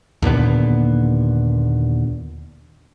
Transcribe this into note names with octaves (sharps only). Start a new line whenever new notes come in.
D#2 A#2 D3 B3